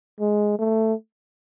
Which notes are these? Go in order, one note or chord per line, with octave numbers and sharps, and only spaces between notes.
G#3
A3